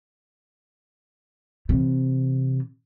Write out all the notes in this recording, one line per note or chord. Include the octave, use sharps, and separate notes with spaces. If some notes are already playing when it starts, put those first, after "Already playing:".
C3 E3